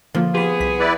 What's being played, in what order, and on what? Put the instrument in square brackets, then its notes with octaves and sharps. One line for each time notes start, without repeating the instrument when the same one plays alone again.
[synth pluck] D3 A#3 F4 [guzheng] F3
[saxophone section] B3 G#4 [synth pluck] F4 G4
[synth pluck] C2 B6
[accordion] E4 B4 D5